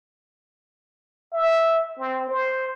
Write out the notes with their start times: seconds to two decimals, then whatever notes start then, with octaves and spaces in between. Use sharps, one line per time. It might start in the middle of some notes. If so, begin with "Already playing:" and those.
1.33 E5
1.99 C4
2.29 C5